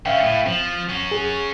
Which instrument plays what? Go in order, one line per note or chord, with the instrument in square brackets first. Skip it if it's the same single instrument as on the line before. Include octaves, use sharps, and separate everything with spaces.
[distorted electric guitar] D3 C#4 [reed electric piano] E5 F5 G5
[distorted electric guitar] A2
[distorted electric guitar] F3 [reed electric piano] C4
[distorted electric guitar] C#4 F#4
[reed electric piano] G#4